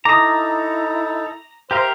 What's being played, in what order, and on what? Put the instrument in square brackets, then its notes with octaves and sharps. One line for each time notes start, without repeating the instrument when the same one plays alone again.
[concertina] D#4 A4 [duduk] E4 [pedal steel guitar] A#5 [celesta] D6 D#6
[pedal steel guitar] G4 A#4 F5 [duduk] C5 [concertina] E5 G5 A#5